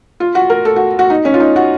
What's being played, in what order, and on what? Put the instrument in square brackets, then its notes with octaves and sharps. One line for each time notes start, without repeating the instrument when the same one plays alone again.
[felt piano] F4
F#4
A#4
A4
F#4
F#4
D#4
C#4
F4
D#4
F#4